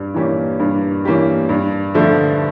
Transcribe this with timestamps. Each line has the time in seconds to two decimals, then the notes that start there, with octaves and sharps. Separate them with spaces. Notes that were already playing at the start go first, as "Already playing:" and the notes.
Already playing: G2
0.14 E3 A#3 C#4 G4
0.60 G2
1.05 E3 A#3 C#4 G4
1.49 G2
1.94 D3 F3 A3